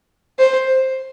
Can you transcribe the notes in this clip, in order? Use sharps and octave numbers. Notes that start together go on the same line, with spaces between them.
C5